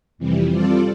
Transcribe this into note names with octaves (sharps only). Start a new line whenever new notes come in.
F2 C3 E3 G3
G3 C4 F4 A4 D5